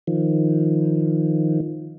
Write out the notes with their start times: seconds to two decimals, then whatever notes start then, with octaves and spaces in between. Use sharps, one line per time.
0.07 D#3 F3